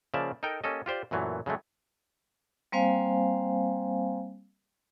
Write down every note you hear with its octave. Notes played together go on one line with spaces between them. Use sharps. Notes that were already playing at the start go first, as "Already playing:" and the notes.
C#3 F3 A#3 D5 E5 A5
D#4 A4 A#4 G5
A#3 C#4 G4 A4 D#5
F4 G4 C5 D5
F#2 A#2 E3 F#3 A3
C#3 F#3 G#3 A3
G3 A#3 C4 C5 F5 G#5